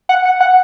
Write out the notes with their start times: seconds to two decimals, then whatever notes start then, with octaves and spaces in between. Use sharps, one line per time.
0.09 F#5
0.25 F#5
0.40 F#5